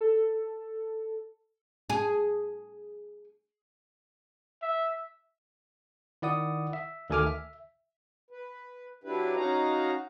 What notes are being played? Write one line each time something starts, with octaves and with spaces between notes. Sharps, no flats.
A4
G#4
E5
D#3 E4 D5 F#5 D#6
E5
D2 D#3 A4 G#5 D6 F6
E5
B4
F#3 D4 E4 G4 B4
C#4 D#4 F#4 F5 A#5